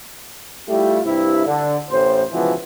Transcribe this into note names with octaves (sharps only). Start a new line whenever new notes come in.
G3 A3 E4 F4 G4
G2 C3 E4
D3
A1 A2 C5
C#2 B2 E3 F3